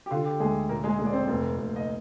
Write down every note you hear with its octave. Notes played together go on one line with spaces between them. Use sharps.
G4
D3 F4
G4
D2 G#3 G#4
A#2 A#3 A#4
G#3 G#4
A#2 G#3 G#4
D5
C4 C5
F1
F1
D#5